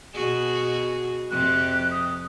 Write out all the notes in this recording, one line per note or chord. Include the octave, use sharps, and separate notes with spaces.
B2 F#4 G#4
F2 C3 G4 F#6
D#6